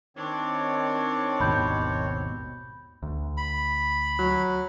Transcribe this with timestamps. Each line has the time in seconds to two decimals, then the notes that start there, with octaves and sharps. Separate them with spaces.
0.17 D#3 C4 D4 C#5
1.40 G#1 D#2 B2 B5 G6
3.03 D2
3.37 B5
4.19 F#3